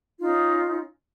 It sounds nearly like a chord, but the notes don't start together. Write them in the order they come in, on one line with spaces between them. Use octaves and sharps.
F4 D#4 C#4